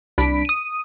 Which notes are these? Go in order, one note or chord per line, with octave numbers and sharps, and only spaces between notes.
C2 D4 B5 B6 D7
D#6 D#7